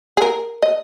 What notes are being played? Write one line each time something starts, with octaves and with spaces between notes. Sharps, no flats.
G#4
A#4
D#5